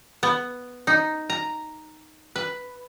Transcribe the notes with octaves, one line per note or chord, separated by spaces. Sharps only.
B3
D#4
A#5
B4